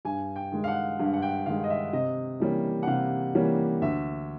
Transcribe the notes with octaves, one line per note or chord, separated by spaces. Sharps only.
G2 G#5
G5
D#3 G#3
F5
F#5
G2
F#5
G5
D#3 G#3 F5
D#5
E5
C3 D#5
E3 G3 A#3 C#4
F#5
C3 F5
E3 G3 A#3 C#4
D2 E5